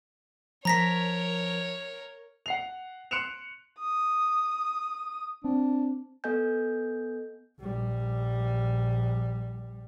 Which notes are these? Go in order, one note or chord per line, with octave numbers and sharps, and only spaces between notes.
F3 A#4 C#5 A#5 A#6 B6
F#5 C7 F7
C6 F#6 C#7 D7 E7 F7
D#6
C4 D4
B3 A4 D#5 G#5 G6
A#1 G3